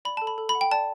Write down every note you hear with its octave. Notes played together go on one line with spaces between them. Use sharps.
D5 B5
A5
A4
B5
A4
B5
F#5
G5
D5 A5